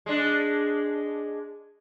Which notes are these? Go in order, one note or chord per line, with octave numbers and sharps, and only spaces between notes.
G#3 D4